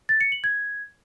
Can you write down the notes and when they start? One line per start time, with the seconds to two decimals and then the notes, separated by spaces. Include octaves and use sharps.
0.09 A6
0.21 C#7
0.32 F#7
0.44 G#6